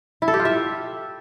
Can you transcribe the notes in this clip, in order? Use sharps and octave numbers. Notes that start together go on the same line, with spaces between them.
E4
A4
G4
F4
E5